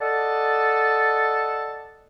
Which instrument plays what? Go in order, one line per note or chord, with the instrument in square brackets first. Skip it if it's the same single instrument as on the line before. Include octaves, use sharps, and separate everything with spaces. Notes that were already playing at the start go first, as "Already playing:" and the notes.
[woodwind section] A4 D5 D#5 F#5 A5